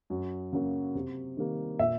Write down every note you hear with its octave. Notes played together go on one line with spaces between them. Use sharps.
F#2
C#3 F#3 A#3
C3
D#3 G3 A#3
A#2 E5